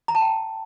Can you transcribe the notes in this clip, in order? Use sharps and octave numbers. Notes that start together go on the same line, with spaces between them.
A#5
A5
G5